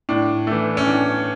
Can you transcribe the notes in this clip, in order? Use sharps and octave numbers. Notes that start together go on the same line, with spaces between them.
A2 D4
E3 A3
C#4
A2 D4